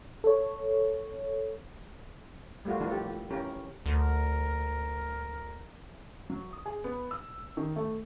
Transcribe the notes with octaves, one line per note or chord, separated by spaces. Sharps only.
A4 C#5
G3 A3 A#3 F4 F#4
E3 F3 A#3 D4 D#4 A4
G4
E3 C#4 G4 A#4
D2 A#4
F#3
D#6
G#4
B3
E6
D#3
A3